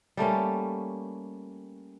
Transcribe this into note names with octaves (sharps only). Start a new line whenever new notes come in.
G3 A3 A#3 C#4